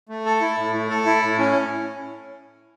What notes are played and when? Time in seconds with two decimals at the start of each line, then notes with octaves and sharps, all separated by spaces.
0.09 A3
0.25 A4
0.41 E4
0.57 A2
0.74 A3
0.90 A4
1.06 E4
1.22 A2
1.38 C#4